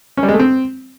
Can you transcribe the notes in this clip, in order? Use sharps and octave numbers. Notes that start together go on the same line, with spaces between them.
C#4
G3
G#3
A3
C4